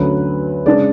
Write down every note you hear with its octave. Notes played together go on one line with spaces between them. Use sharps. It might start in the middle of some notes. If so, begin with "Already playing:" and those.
Already playing: D2 D3 F#3 C#4 B4
C#3 G#3 D4 D5